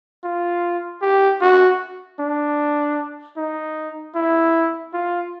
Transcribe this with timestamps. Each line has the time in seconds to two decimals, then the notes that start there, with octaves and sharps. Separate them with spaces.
0.24 F4
1.02 G4
1.41 F#4
2.19 D4
3.37 D#4
4.15 E4
4.93 F4